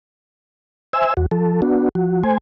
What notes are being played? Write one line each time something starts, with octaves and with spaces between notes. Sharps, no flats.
C5 E5 G#5 E6
E2 F#4
F3 A4
B3 D4 F#4
F3 F#4
A3 C5 G#5